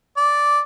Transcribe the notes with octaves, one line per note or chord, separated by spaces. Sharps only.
D5